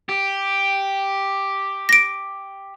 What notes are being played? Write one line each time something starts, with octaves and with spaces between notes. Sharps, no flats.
G4
A#6 D7